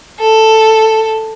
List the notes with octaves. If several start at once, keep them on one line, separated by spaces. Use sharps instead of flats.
A4